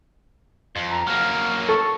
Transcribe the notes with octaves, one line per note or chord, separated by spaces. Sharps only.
F2
A#5
F#3 A#3 F6
A4 C#6